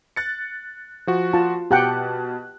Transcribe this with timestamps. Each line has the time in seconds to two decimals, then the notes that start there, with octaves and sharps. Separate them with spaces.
0.16 F#6 A6 C#7
1.07 F3 F#4
1.33 F4 A5
1.71 B2 G4 F#5 G5 A5 F#6